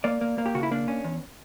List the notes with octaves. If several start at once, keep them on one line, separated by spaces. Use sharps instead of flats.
A#3 D5
A#3
A#3
G4
C#3 F#4
E4
A#3 D4
C#4
E2